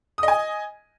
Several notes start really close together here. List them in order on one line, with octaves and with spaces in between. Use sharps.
D#6 D#5 G#5